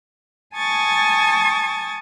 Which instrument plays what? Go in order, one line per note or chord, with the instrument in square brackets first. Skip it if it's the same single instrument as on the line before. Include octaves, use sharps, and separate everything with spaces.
[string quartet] G#5 A5 C#6 D#6 G#6 A6